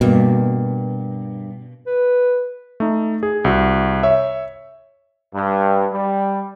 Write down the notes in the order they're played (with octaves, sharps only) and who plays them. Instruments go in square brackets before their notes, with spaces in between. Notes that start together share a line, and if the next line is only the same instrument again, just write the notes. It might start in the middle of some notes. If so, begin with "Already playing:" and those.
[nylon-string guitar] G2 A#3 [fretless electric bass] B2
[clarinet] B4
[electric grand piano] A3 D#4
G#4
C2 F#4
C#5 E5
[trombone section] G2
G3